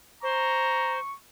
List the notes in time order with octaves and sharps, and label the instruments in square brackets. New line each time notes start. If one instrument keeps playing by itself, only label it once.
[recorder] C5 [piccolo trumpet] A#5 [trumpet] C#6